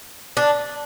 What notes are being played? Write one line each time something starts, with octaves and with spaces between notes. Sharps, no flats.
D4